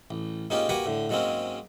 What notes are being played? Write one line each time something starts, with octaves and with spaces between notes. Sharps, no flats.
A1
G#2 A#3 C#4 D#4 F4 G4
A#3 F#4 G4 B4 F#5 G#5
A2 D3
G#2 F#3 G#3 A#3 C4 C#4